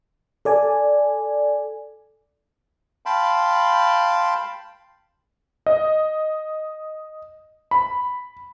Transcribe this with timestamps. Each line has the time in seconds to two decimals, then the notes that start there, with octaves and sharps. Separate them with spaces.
0.45 A4 D5 G#5
3.06 F5 G5 A5 B5 C6
5.66 D#5
7.71 B5